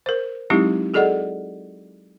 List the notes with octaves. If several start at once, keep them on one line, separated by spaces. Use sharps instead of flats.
A#4 C5
F#3 G#3 C4 D#4 E4 G4
F#4 G#4 A4 D5 D#5 F#5